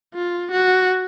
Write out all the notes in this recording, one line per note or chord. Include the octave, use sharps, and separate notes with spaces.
F4
F#4